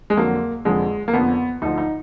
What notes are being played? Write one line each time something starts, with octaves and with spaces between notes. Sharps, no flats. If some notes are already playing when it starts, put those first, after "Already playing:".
G#3
F2 D3 F#3 A#3
F1 F2 D3 F3 G#3
A#3
F1 F2 D3 F3 B3
D2 D3 F3 D#4
D#4